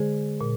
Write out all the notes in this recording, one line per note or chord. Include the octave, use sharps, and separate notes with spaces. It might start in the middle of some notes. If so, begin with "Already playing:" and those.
Already playing: D3 G#3 G#4 C5
A#2